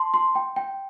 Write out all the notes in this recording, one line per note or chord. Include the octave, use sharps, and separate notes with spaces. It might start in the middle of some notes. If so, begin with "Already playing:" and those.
Already playing: A5 C6
C6
G5
G5